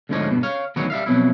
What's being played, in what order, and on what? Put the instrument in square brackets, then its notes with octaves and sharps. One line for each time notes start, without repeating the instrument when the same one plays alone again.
[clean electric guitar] D2 G#2 D3 F3 D#4 C#5
G2 B2
C#5 F5
D2 D#3 E3 F#3 B3 C#5
G3 E5 F5
F2 B2 F#3 E4